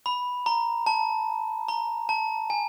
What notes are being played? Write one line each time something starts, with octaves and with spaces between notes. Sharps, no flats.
B5
A#5
A5
A#5
A5
G#5